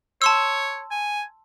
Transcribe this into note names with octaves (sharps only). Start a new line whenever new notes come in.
C#5 A5 C6 E6
G#5